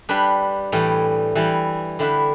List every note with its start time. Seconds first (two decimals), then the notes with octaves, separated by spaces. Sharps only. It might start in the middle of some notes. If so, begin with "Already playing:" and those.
0.09 G3 D4 B4
0.72 A2 E3 G3
1.35 E3 G3 E4
1.99 D3 G3 E4 B4 E5